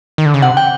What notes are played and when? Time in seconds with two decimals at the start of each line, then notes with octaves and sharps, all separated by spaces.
0.18 D#3
0.26 D3
0.34 C#3
0.42 C3 F#5
0.57 G5